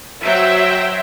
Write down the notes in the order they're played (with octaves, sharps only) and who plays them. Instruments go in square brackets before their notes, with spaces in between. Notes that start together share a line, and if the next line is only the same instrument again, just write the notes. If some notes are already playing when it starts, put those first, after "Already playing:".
[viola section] F#3 C5 G5 [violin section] E5